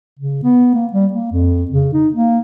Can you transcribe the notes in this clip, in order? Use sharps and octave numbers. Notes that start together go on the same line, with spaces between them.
C#3
B3
A#3
G3
A#3
F2
C#3
D#4
A#3